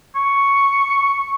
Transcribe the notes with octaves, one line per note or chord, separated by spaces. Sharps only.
C#6